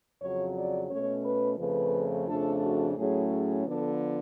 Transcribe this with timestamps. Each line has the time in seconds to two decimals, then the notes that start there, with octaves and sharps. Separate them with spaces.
0.19 F2 C#3 F#3 C#5
0.54 D5
0.89 B2 A3 C#4 C#5
1.23 B4
1.57 F2 C#3 F3 A3 B4
2.27 F2 C#3 F3 A3 D4 A4
2.62 F#4
2.96 A2 F#3 A3 C#4 G#4
3.30 G#4
3.65 D3 F3 B3 A4